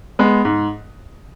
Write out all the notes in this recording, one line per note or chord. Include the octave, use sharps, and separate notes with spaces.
G#3 B3
G#2